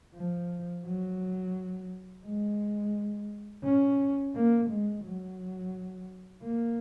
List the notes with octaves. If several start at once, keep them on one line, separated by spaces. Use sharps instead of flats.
F3
F#3
G#3
C#4
A#3
G#3
F#3
A#3